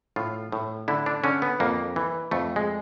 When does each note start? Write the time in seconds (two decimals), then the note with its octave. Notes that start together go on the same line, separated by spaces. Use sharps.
0.16 A2 F4
0.52 A2
0.88 D3 E4
1.06 D4
1.24 D3 C#4
1.42 B3
1.60 F2 A#3
1.96 E3
2.31 F2 A3
2.56 G#3